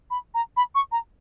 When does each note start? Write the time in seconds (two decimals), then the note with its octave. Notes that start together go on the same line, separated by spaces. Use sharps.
0.10 B5
0.34 A#5
0.57 B5
0.75 C#6
0.92 A#5